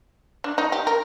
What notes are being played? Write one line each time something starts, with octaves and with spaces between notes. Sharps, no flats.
D4
D#4
G4
A#4